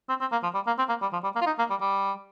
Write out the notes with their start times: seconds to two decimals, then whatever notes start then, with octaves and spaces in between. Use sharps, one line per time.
0.09 C4
0.21 C4
0.32 A#3
0.43 F3
0.54 G3
0.67 A#3
0.78 C4
0.89 A#3
1.02 G3
1.13 F3
1.24 G3
1.35 A#3
1.41 F4
1.46 D#4
1.59 A#3
1.70 G3
1.81 G3